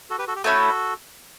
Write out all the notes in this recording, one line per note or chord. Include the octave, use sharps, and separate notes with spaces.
F#4 A4
G4 B4
F#4 A4
G4
A3 C#4 E4 F#4 A4